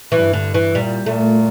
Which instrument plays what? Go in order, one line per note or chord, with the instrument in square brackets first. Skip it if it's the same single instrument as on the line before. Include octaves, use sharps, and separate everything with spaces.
[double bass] G2 [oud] E3
[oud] D3
E3
[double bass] A#2 [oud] G3
[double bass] A#2 [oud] A3